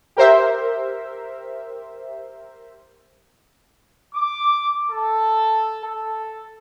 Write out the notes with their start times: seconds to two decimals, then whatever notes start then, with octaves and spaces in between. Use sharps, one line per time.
0.17 G4 A#4 C5 E5
4.15 D6
4.91 A4
5.85 A4